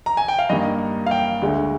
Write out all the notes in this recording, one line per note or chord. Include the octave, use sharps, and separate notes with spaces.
A#5
G#5
G5
F5
G2 D#3 A#3 D#5
F5
G5
D2 D3 G#3